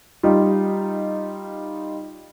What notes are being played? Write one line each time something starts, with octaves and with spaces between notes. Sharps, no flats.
G3 D#4 F4